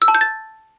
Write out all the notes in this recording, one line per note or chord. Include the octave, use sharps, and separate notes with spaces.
E6
A5
G6
A6